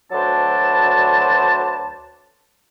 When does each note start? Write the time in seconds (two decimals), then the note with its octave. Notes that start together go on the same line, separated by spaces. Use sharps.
0.12 D2 F#3 D4 B4 C5 A5